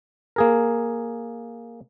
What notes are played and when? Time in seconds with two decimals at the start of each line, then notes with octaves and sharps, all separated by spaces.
0.36 A#3 G#4 A#4